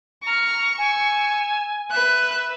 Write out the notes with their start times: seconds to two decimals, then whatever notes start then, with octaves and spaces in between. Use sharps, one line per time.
0.25 A#5 C#6 F6
0.78 G#5 E6
1.91 B4 E5 F#6